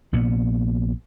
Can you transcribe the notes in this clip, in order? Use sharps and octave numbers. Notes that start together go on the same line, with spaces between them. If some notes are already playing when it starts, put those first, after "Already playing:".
A#1 A#2 B3